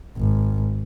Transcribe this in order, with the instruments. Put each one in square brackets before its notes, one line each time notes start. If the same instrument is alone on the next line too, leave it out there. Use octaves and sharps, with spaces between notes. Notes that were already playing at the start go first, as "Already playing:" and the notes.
[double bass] G#1